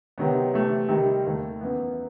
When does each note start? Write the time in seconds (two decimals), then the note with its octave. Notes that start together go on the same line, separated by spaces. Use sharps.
0.18 C3 D#3 F#3 B3
0.54 C3 E3 A3
0.89 C3 D#3 G3 D#4
1.25 D#2 D#3 A3
1.61 F#2 E3 B3